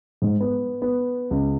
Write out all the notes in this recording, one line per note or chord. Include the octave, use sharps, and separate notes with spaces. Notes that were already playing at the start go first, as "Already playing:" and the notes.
G#2
B3
B3
C#2